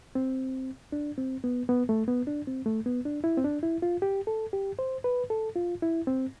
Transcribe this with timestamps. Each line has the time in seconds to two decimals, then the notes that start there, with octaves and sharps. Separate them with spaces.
0.15 C4
0.92 D4
1.18 C4
1.44 B3
1.69 B3
1.89 A3
2.08 B3
2.27 D4
2.47 C4
2.66 A3
2.86 B3
3.05 D4
3.24 E4
3.37 C4
3.44 D4
3.63 E4
3.82 F4
4.02 G4
4.27 A4
4.53 G4
4.79 C5
5.04 B4
5.30 A4
5.56 F4
5.82 E4
6.07 C4